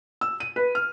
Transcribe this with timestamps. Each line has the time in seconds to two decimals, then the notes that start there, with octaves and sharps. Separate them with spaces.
0.21 E6
0.40 D#7
0.56 B4
0.75 F6